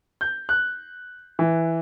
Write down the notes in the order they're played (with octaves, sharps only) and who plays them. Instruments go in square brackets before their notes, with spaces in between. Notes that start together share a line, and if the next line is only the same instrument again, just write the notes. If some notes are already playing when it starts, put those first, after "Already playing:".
[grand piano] G6
F#6
E3